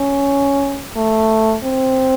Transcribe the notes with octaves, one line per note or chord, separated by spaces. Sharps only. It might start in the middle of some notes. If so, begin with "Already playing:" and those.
Already playing: C#4
A3
C4